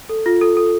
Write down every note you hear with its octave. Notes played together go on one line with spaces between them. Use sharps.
A4
F4
A4
A4